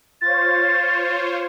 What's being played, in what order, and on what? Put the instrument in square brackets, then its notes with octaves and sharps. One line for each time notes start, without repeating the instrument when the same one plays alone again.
[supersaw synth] F4 C5 C#5 [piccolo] A6